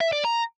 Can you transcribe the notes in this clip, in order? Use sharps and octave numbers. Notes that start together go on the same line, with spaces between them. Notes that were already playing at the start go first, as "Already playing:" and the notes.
E5
D5
A#5